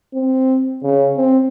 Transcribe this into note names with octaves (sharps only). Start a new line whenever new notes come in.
C4
C#3
C4